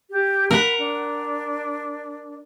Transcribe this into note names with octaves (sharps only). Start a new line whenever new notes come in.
G4
A#4 F#5 B5
D4